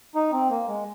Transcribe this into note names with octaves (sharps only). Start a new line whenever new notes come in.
D#4
C4
A#3
G#3